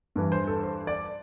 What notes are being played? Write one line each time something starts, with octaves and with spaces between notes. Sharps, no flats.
G2 E3
C5
A4
C5
D5